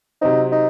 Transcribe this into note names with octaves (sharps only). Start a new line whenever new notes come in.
C3 F#3 C4 D#4
D#4